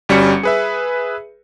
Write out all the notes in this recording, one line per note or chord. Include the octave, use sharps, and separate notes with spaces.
G1 G3 C#4 F#4 C#7
G#4 B4 E5